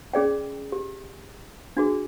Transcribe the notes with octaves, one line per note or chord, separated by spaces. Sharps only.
C#4 G#4 D5 G5
G4
D4 F#4 G#4